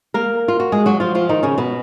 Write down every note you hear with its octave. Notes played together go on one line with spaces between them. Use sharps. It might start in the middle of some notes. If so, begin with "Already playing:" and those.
A#3 A#4
F4
F#4
G#3 G#4
F#3 F#4
F3 F4
F3 F4
D#3 D#4
C#3 C#4
B2 B3